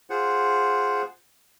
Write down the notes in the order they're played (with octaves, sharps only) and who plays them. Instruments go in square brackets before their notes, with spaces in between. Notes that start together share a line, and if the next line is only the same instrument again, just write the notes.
[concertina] F4 G#4 C5 F#5